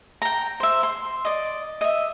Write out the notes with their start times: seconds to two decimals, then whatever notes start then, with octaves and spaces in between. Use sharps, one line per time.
0.22 G5 A#5
0.60 C5 E5
0.83 C6
1.25 D5 D#5
1.81 D#5 E5